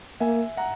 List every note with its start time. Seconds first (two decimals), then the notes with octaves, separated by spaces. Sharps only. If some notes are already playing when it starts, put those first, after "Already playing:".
0.20 A#3 E5 G#5
0.57 F#5 A#5